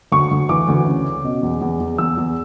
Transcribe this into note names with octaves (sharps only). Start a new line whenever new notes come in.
D2 C#6
D2
E3 D6
D2
C#3
C#3
B2
E2
E2
E2
E2 E6
E2